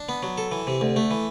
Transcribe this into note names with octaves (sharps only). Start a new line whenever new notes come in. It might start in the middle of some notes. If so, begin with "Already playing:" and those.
Already playing: D4
B3
F#3
A4
E3
C3
D2
A3
E3